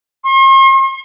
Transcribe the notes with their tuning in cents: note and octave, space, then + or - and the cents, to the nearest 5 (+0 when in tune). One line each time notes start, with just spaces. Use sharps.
C6 +45